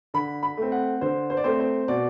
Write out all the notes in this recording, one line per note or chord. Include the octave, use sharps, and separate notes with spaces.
D3 B5
B5
A3 C4
F#5
D3 C5
C5
D5
A3 C4 C5
C5
B2 D5